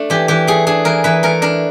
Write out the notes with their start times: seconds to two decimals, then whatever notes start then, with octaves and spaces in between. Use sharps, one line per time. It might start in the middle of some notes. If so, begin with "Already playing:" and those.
Already playing: A3 D4
0.10 E3 G4
0.28 E3 G4
0.47 A3 G#4
0.67 D4 G#4
0.85 E3 A#4
1.04 E3 B4
1.23 A3 A#4
1.42 D4 A#4